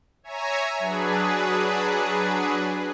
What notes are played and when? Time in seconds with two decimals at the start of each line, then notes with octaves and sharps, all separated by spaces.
0.23 C#5 E5 G#5 A#5
0.79 F#3 D4 G#4 B4